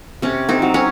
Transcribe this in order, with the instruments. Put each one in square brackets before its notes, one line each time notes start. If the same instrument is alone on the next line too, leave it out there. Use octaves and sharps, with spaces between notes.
[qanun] C3 C#4
C4 D#4
F#3
C#4